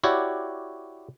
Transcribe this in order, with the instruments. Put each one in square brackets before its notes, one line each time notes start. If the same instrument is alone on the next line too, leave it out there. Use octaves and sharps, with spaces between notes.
[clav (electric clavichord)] E4 F#4 G4 C#5 D5